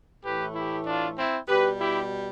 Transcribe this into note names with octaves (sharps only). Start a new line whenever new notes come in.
A2 E3 A3 G4 B4
E4 G4
D4 F4
C4 E4
B2 G3 G4 B4
E4 G4